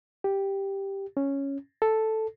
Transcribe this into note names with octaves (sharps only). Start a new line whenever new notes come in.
G4
C#4
A4